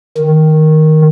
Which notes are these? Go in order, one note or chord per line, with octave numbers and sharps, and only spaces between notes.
D#3